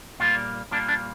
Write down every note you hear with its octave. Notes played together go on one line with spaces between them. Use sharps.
A#2 G3 A#3 F4
A#2 G3 A#3 D4
D4